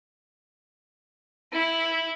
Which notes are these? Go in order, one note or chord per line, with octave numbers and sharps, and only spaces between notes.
E4